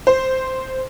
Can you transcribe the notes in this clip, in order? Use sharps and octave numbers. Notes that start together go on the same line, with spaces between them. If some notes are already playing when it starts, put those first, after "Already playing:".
C5